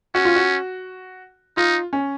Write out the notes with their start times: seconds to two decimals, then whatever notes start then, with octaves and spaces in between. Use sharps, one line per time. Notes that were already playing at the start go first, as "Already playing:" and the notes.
0.15 C#4 F#4
0.25 F4
0.36 F#4
1.57 D#4 F4
1.93 C#4